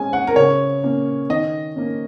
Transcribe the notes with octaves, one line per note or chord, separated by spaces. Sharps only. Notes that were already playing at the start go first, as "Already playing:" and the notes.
Already playing: G#3 C#4 G#5
F#5
A#4
C#3 C#5
A#3 C#4
D#3 D#5
A#3 C#4